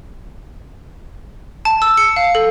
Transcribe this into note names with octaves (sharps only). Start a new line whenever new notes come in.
A5
E6
C#7
F5
A4